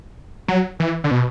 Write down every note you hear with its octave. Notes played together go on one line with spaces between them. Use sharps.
F#3
E3
D3
B2